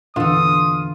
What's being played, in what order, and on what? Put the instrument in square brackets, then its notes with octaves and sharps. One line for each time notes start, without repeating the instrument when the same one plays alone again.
[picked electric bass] E2 A#2 E3 [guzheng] D3 A4 [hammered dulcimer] F4 [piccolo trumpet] D#6